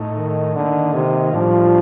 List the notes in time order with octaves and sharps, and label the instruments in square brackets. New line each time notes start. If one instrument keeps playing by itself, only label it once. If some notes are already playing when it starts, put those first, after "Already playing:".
Already playing: [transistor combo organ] A2 A3 D#4
[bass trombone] D#3
[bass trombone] D3 [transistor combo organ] D#3 A#3 D#4
[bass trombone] C3
[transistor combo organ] A2 G3 D4 F4 [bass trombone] F3